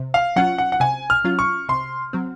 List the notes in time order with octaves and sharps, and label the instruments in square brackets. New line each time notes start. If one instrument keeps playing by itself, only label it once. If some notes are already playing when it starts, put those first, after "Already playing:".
Already playing: [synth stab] C3
[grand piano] F5
[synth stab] F#3 C#4 F4 [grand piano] F#5
[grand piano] F#5
F#5
[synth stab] C3 [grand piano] G#5
[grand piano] F6
[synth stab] F#3 C#4 F4
[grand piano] C#6
[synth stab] C3 [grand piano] C6
[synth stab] F#3 C4